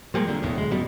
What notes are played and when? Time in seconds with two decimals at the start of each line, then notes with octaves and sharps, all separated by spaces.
0.14 F3 G3 G#3 A#3
0.28 F2 D3
0.43 F1 A#1 E2 A2
0.55 D1 G#3
0.71 F#2 B2 G3